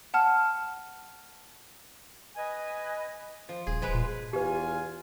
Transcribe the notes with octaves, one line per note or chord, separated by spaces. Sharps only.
F#5 A5 F6
B4 D#5 G#5
F3
D#1 G#4
F3 G#3 B4
A#2
E2 F4 G4 B4 G#5